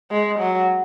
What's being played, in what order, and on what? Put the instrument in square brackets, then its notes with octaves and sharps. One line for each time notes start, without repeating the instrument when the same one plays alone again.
[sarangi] G#3
F#3